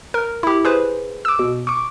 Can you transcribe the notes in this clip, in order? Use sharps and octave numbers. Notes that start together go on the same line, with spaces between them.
A#4
E4 G4
G#4 B4 C5
D6 E6
B2
C#6 D6